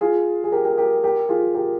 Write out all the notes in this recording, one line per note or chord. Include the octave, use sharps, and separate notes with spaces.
F4 G#4
G#4
G4 A#4
G4 A#4
G4 A#4
G4 A#4
F4 G#4
G4 A#4